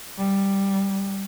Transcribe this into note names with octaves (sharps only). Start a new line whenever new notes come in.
G3